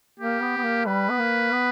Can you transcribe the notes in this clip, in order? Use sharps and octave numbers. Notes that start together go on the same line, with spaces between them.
A#3 G4
B3
B3
A#3
G3 B4
B3
A#3
B3